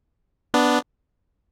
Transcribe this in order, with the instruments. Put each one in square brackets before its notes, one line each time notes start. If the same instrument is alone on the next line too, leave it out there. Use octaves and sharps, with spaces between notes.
[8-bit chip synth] B3 D4